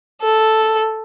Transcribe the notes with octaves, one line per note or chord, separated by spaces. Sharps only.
A4